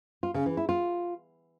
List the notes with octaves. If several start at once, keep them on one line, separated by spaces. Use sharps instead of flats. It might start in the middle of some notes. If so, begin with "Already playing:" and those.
F4
C#3
E3
E4
F4